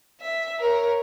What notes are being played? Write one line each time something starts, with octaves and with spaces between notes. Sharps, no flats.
E5
A#4 C#5